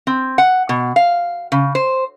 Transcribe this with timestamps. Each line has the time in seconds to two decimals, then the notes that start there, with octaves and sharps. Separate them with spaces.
0.07 C4
0.38 F#5
0.69 B2
0.96 F5
1.52 C#3
1.75 C5